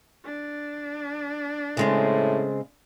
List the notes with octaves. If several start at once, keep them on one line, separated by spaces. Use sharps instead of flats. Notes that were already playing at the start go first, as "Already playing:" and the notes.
D4
A2 C#3 G#3 C4